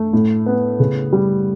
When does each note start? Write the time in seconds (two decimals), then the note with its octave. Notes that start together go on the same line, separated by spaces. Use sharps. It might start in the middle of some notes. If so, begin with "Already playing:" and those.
Already playing: A3
0.13 A2
0.46 B3
0.80 C#3
1.13 G3